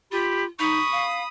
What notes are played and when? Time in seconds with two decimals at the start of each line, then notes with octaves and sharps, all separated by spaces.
0.12 F4 G4 B5
0.59 D#4 B5 C#6 D#6
0.92 F5